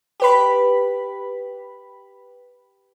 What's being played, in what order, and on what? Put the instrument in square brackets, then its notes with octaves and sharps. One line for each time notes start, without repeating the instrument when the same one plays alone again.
[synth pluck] G4 B4 B5